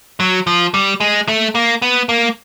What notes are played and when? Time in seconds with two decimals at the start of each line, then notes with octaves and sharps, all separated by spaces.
0.20 F#3
0.47 F3
0.74 G3
1.00 G#3
1.28 A3
1.55 A#3
1.82 B3
2.09 A#3